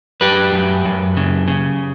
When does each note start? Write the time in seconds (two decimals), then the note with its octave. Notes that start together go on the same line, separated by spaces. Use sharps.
0.21 F#2 G4 B4
0.52 F#2
0.85 F#2
1.17 C#3
1.48 C#3